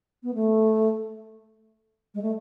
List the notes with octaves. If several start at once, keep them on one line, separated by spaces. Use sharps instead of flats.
B3
A3
G#3
A3